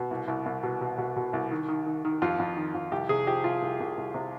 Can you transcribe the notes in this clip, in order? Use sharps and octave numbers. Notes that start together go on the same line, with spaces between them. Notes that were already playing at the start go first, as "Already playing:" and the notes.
Already playing: B2
C2
C2
C2
B2
B2
B2
B2
C2
D#3
D#3
D#3
D#3
F2 F4
F2
D#3
F2
C2 G4
C3 G#4
F3 G4
C2 F4
C2
C2
C2
C3